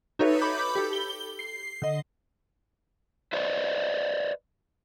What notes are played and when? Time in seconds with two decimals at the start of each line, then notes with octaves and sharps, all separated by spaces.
0.19 D#4 F#4 A4 B4 C#5 E5
0.41 B5 D6 G6
0.75 G4 A4
0.93 G7
1.39 C7
1.82 D3 D#5
3.33 B4 C5 D5 D#5